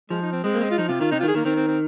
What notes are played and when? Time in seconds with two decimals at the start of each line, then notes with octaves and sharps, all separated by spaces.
0.10 F3 G#3
0.22 D#4
0.33 C4
0.44 G#3 C4
0.54 A#3
0.61 G#3
0.71 F4
0.78 F3 D#4
0.88 C3 F4
1.00 D#3 F4
1.11 C3 D#4
1.20 F4
1.23 D#3
1.28 G#4
1.34 D#3 A#3
1.45 D#3 C4
1.56 C4
1.68 C4